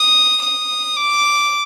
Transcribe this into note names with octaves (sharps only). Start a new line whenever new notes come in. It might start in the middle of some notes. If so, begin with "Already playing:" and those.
Already playing: D#6
D#6
D6